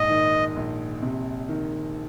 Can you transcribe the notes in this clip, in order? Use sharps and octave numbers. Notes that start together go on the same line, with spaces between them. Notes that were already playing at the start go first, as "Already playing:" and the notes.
Already playing: A#1 G#2 D#5
D#3
A#1
C3
D#3